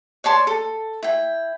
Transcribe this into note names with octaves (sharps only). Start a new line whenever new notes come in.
C#5 D5 A5 C6
A4
E4 G5